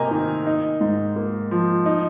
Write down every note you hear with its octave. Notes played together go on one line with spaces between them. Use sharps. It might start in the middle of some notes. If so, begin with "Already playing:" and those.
Already playing: C3 A#3 D#5 G#5 A#5
D#3
D#4
G#2
A#3
F3
D#4